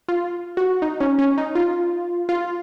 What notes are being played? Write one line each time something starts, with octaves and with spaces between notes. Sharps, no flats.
F4
F#4
D#4
C#4
C#4
D#4
F4
F4